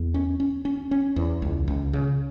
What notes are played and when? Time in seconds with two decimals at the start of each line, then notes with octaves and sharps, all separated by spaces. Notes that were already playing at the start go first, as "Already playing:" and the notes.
Already playing: E2
0.14 C#4
0.40 C#4
0.65 C#4
0.91 C#4
1.16 E2
1.42 C#2
1.68 C#2
1.93 C#3